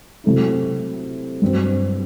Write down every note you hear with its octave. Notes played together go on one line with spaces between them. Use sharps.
C3 F#3 A3 E4
G2 F#3 C4